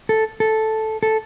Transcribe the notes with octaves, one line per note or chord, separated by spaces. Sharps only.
A4
A4
A4